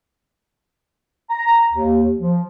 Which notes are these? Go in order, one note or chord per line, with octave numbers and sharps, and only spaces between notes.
A#5
D#2
F3